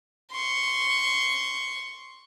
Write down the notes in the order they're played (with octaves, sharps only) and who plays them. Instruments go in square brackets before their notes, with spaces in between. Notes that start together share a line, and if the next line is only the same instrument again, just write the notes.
[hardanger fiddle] C6 C#6